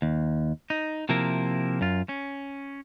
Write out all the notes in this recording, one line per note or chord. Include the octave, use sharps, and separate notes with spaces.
D#2
D#4
C3 F3 A#3 E4 A#4
F#2 F4
C#4